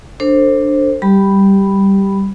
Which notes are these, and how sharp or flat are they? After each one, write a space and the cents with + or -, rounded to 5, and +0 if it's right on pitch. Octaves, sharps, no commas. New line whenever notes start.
D4 +0 A4 +35 C5 +20
G3 -5 G4 +0 B5 +0